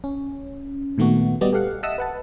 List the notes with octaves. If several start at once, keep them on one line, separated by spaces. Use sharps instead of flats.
C#4
A#2 D#3 A3 B3 F#4
G3 B3 F#4 G4 D5 D#5
G4 A4 F5 F#5
D#5 E5 F#5 A5 D#6 E6
B4 F#5 A5